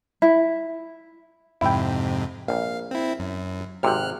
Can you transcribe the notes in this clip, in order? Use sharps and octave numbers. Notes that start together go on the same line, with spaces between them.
E4
F2 G#2 C3 E4 G5
A#1 F5
C4 E4
F#2
G#1 C3 F6 F#6